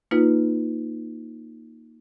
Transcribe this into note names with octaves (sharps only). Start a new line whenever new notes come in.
A#3 D#4 F4 B4